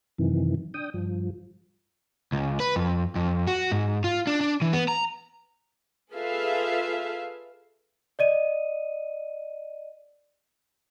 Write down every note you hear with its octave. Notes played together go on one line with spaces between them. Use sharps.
F#2 C3 D#3 E3
D4 G5 D#6
G2 F3
C#2
B4
F2
F2
F#4
G#2
F4
D4
D4
E3
B3
A#5
F4 G#4 A4 B4 E5 F5
D5 D#5 D#7